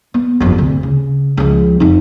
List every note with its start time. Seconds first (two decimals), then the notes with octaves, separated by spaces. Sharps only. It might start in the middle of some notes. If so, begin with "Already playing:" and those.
0.14 B3
0.40 G1 F2
0.58 D2 C3
0.83 C#3
1.37 C#2 F3
1.80 F2 D#4